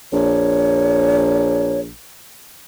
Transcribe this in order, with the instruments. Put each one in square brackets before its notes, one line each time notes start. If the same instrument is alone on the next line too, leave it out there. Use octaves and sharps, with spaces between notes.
[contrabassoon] A#1 [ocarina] C#5